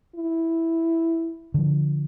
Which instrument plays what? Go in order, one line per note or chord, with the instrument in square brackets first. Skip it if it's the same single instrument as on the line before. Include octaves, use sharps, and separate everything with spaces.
[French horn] E4
[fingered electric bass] D3 F3